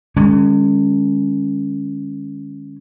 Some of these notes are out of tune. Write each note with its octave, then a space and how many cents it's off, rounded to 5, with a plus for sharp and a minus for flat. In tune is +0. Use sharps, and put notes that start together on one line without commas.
D3 +45 G#3 -25 C#4 +0